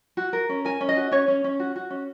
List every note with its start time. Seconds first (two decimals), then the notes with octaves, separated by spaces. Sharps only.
0.17 F#4
0.33 A#4
0.49 C#4
0.65 A#4 G#5
0.81 C#4
0.89 D#5
0.97 F#4
1.11 C#4 C#5
1.28 C#4
1.44 C#4
1.59 F#4
1.76 F#4
1.90 C#4